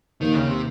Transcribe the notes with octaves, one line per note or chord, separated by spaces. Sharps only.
D#2 D#3
C#3
C3